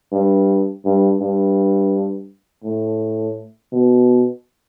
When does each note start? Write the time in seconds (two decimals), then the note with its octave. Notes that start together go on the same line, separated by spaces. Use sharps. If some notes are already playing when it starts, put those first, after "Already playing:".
0.12 G2
0.85 G2
1.20 G2
2.64 A2
3.73 B2